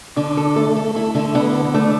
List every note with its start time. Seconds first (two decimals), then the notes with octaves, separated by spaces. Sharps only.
0.17 D3 D4
0.37 A4
0.56 A3 A4
0.76 A4
0.95 A3 E4
1.15 D3
1.35 D3 B3
1.54 A4
1.65 B3
1.74 A3 D4